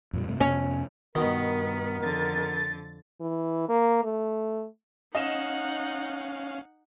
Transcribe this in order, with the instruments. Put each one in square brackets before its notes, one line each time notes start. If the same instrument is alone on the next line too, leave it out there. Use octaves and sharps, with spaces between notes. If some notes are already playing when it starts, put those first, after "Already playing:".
[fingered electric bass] F2 A#2 G3
G2 C3 A3
[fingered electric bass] F2 C3 B3 [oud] C#4
[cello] G2 B3 [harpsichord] B2 D#3 [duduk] A#4
[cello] F2 D3 [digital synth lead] A6
[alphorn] E3
A#3
A3
[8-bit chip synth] C#4 F5 [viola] D#4 F#5 [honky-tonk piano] D#5 E7